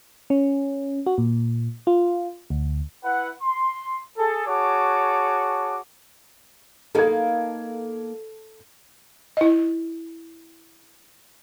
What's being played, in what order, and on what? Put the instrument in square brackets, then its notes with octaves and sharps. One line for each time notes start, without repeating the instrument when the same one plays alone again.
[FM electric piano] C#4
F#4
A#2
F4
D2
[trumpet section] E4 B4 F#5
C6
G#4 A4
F#4 G#4 C#5 A5 D6
[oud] A#3 B3 D#4 [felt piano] A4 G#6
[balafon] E4 D#5